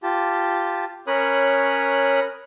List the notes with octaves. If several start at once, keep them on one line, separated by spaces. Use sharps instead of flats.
F4 G4 A5
C#4 A#4 C#5 B5 D#6 F#6